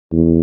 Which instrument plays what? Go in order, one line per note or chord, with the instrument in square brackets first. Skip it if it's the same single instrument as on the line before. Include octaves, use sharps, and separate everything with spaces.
[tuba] E2